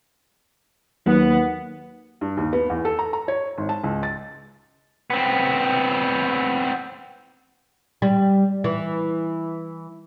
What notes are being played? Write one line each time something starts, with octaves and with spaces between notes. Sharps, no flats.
D#2 F#3 B3 F#5
G2
D#2
B3
E2
A4
A#5
A#5
C#5
G#1
A5
C#2
A6
B3 C4
G3
E3